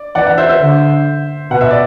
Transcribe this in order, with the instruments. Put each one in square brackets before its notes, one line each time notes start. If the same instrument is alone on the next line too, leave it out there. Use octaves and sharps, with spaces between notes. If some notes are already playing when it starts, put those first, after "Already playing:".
Already playing: [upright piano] D5
[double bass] E3 [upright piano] D5 F#5
[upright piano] D5 F#5
C5 E5
C5 E5
[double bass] D3
[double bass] B2 [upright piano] F#5
[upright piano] E5
D5